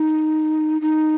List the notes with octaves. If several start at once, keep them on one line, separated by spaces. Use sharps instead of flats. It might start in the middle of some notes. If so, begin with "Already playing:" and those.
Already playing: D#4
D#4